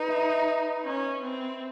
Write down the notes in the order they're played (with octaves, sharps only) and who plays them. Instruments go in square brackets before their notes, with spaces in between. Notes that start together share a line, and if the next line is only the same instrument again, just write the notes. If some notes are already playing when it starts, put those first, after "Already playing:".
Already playing: [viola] D#4 [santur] B4
[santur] E5
[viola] C#4
C4